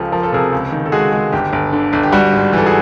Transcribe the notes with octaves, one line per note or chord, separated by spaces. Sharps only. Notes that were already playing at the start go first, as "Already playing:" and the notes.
Already playing: C#2 F3 G4 A4
F3 A#4
A4
C3 G#4 A#4
C#2
D#3
A4
G#3 F#4 G#4
G#3
G1 G4
G1
D3
G1
G4
G3 F#4
G#2
E3 A4
F#4 G#4